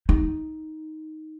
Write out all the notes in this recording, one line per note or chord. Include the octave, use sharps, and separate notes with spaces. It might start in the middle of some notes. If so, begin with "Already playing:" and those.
D#4